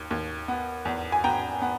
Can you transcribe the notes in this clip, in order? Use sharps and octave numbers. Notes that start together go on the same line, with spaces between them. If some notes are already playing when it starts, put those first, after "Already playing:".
Already playing: D#2
D#2
B3
E2
G#5
B3 G5 A#5
B3